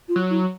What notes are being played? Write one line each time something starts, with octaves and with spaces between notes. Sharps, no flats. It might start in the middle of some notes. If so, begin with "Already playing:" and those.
F4
F#3
E4